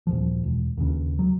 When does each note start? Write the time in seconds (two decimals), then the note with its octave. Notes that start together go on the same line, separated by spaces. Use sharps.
0.07 D#1 C2 F3
0.43 E1
0.77 D#2 C#3
1.19 F#3